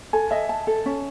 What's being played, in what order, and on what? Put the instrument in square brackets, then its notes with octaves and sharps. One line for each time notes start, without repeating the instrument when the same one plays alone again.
[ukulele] A4 [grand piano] G#5
[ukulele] D#5 [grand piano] E5
[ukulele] A5
A4
C#4